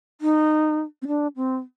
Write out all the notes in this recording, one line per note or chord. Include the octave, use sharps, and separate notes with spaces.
D#4
C4
D4
C4